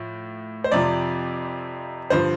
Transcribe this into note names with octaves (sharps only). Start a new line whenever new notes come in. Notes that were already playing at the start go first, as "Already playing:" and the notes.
Already playing: A2 F3
C5
F2 C3 F3 D5
G2 D3 F3 C5